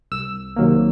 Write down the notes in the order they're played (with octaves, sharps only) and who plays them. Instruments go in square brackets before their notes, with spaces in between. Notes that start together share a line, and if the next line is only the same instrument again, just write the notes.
[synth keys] C2 E6
C3 D#3 F#3 A#3